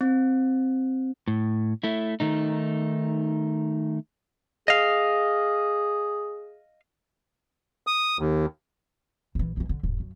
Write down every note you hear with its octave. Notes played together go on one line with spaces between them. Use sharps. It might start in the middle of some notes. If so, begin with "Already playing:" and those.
C4
A2
A3 E4
D#3 A3 D#4
G#4 D#5 F5
D#6
D#2
A#1 E3
E3 G#3
D3
D#1 G#2
F#2